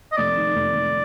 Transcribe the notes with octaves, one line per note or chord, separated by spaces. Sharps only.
D#5
F1 D5
D#3
F1
F1